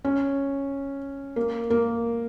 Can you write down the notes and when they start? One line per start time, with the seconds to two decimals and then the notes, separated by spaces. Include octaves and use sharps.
0.05 C#4
1.36 A#3
1.70 A#3